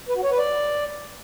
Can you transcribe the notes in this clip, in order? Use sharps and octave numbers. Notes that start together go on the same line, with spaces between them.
B4
F#4
C#5
B4
D5